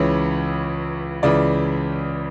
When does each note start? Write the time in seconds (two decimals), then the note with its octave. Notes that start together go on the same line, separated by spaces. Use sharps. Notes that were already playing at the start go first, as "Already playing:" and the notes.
Already playing: C#2 C#3 E3 C#5
1.23 C#2 C#3 E3 D5